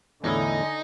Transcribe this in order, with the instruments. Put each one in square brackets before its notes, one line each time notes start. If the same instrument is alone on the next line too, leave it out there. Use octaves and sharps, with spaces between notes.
[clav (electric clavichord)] E2 A2 E4 [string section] D3 [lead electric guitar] D#4 [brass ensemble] D#5 G#5